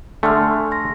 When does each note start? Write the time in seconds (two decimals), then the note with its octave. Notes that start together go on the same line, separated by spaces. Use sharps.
0.23 D3 A3 G#5 C6 F6
0.71 C6 A#6